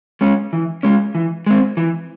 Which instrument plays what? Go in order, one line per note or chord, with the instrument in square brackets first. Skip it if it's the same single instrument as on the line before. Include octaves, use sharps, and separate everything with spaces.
[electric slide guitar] G#3 C#4
E3
G#3 C#4
E3
G#3 C4
E3